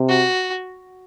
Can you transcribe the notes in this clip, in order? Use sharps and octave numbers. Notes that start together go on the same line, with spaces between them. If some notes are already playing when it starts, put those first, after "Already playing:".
Already playing: C3
F#4